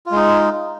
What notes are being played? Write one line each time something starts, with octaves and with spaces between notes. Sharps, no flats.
G#3 D#4 F4